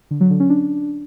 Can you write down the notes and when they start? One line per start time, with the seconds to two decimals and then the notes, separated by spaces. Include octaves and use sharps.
0.11 D3
0.21 F#3
0.30 D3
0.40 C#4
0.50 D4